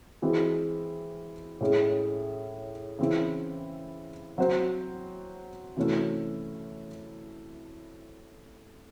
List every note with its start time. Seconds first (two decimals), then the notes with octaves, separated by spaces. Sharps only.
0.22 E3 G#3 C4 F#4
1.61 A2 G#3 C#4 G#4
2.99 C#3 E3 C4 E4
4.38 F#3 C4 F#4 C5
5.77 C3 E3 A3 C#4 F#4